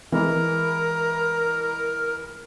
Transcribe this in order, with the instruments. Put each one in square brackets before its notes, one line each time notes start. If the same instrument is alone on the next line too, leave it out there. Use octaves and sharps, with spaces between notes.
[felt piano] E3 G#3 E4 [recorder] A#4